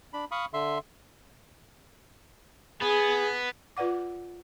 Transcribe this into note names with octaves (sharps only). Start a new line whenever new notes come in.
D4 B5
F5 B5 C#6 D#6
D3 E5 C6
B3 G#4
F4 B4 D5 F#5 D6